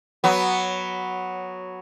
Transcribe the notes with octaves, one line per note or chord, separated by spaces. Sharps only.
F#3 B3